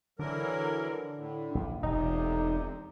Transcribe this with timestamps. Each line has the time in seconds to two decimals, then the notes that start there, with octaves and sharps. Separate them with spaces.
0.19 D3 E3 F#3 A#4
1.17 A2
1.55 A#1
1.83 E1 F2 C3 D#4